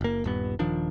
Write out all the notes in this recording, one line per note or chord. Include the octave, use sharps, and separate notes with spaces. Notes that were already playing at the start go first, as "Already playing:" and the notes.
F#1 A#3
D#1 G2 B3
D#1 D#3 F3 D4